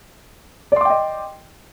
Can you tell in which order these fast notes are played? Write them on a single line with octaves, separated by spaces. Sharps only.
D5 C6 D6 G5 D#5